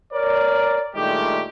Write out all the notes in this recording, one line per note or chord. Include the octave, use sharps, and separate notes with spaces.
A#4 C#5 D5
G2 A#2 D#3 G#3 A3 G4